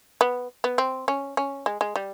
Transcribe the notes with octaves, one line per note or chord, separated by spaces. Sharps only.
B3
B3
C4
C#4
C#4
G#3
G#3
G3